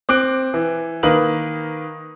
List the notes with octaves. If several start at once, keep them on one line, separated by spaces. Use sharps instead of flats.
C4 D6 F#6 D7
E3
D#3 A#3 B4 D#6 F#7